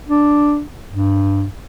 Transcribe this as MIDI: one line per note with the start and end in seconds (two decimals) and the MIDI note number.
0.08 0.62 62
0.91 1.46 43